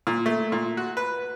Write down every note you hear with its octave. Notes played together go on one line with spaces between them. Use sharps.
A#2
A3
A#2
F#4
B4